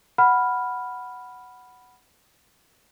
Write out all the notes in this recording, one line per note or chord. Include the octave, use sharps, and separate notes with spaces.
F#5 B5 F6